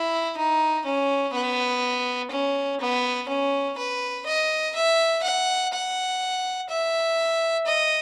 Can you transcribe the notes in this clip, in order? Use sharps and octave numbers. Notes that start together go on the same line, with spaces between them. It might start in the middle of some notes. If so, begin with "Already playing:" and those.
Already playing: E4
D#4
C#4
B3
C#4
B3
C#4
B4
D#5
E5
F#5
F#5
E5
D#5